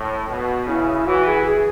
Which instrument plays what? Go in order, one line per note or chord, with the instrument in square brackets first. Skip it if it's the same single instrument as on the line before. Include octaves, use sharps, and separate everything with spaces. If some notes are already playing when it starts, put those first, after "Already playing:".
Already playing: [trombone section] A2
B2
[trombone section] C#3 [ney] E4
[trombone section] E3 [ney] F#4
[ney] G#4
G#4